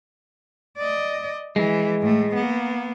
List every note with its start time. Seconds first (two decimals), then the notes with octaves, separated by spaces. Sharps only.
0.78 D5 D#5
1.56 E3 G#3
2.01 A2 A3
2.35 A#3 B3